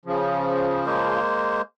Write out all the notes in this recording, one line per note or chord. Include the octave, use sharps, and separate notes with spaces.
C#3 F3
G#3 A#3 C5